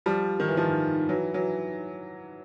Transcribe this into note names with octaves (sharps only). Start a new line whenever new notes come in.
F3 G3
D#3
E3
D#3 F3
E3 F#3
E3 F#3